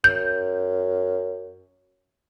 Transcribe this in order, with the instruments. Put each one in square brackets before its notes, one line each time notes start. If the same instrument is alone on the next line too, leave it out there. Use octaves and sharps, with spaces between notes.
[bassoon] F#2 [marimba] G6